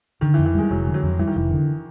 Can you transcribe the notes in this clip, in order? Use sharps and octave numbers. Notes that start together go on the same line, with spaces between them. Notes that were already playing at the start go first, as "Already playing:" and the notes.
D3 D#3
E3
F2
E3
G3 G#3
F1 F#3
D3
F#3
F2
E3 G3
D#3
F1 E3
D3